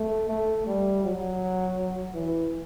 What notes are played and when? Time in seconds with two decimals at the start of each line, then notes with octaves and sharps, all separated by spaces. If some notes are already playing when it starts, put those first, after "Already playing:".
Already playing: A3
0.29 A3
0.66 G3
1.04 F#3
2.14 E3